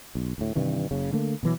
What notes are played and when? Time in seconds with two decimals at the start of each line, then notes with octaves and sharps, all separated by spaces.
0.15 B1
0.38 D2 A2
0.55 G2 C3 D#3 E3
0.91 F#1 C#3
1.13 D3 A3 A#3
1.43 B2 E3 F#3